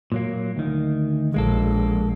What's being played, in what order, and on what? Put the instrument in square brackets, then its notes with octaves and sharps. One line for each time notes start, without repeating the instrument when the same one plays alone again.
[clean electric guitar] A#2 F#3 A#3
D2 D#3
[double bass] A#1 [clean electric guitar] G#3 A#3 A4